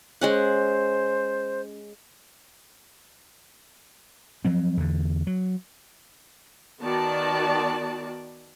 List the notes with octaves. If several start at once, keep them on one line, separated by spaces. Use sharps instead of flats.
G#3 C#4 C5 F#5
F3 F#3 C4
E2 D3
F#3
D#3 B3 F#4 D5 A5